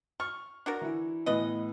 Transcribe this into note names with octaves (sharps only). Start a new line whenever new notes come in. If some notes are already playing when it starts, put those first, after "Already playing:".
C#6 F6
D4 F#4 A#4
E3 E4
A2 E3 B3 B4 D#5